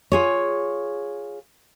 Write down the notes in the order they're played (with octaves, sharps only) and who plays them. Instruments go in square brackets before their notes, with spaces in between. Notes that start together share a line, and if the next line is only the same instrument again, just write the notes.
[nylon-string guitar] F4 G#4 C#5